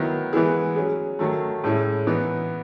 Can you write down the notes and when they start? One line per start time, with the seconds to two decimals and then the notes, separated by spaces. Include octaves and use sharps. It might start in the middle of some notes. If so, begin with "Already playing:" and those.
Already playing: D#3 F#3 B3 E4
0.33 E3 G#3 B3 E4 G#4
0.76 F#3 C#4 G#4
1.19 D#3 F#3 A3
1.64 A2 G#3 C#4 E4
2.07 E3 B3 D#4